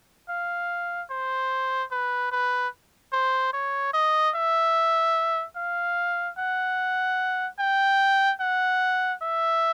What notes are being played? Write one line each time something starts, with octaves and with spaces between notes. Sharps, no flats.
F5
C5
B4
B4
C5
C#5
D#5
E5
F5
F#5
G5
F#5
E5